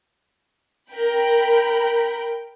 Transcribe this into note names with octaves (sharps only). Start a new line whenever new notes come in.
A#4 G5 B5